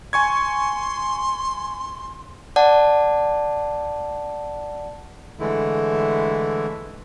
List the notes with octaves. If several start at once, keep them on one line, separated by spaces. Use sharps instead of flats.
G#5 C6 C#6 G#6
D5 F#5 A5
D3 E3 G#3 A3 E4